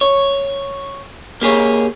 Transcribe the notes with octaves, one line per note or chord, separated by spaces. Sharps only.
C#5
A#3 G4 G#4 C#5